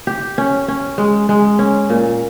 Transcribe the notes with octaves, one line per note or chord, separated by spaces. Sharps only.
G4
C#4
C#4
G#3
G#3
C#4
A#2